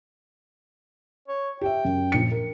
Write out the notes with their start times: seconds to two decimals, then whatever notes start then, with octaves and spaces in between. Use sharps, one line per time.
1.28 C#5
1.61 G4 E5 G5
1.85 F#2
2.12 A#1 C#7
2.31 A#4